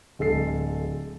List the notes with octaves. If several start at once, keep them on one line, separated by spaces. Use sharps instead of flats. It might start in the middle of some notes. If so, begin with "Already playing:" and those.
D1 G#3 A4 C7